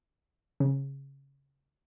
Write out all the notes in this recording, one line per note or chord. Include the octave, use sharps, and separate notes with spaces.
C#3